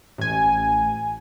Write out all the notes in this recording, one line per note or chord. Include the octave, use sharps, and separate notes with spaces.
A1 G#5